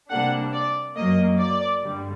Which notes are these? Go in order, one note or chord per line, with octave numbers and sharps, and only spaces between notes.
C3 G3 A#3 D4 F#5
D5
F#2 F#3 A#3 D#5
D5
G2 D3 G3